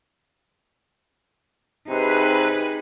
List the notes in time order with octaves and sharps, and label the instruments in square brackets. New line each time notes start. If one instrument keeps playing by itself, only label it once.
[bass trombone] C3 [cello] D#4 G#4 [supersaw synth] B4